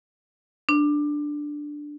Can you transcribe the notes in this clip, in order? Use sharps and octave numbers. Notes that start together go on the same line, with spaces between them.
D4